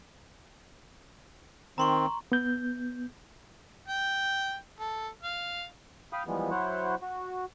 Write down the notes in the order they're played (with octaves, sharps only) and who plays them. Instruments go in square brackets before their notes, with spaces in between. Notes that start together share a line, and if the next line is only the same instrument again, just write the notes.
[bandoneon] D#3 C4 [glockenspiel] A#5 C6 C#6
[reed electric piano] B3 G6
[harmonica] G5
A4
F5
[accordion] F5 G5 B5 D#6 F6
E3 F3 G3 G#3 B3
F#3 E4 C5 C#5 F#5
F#4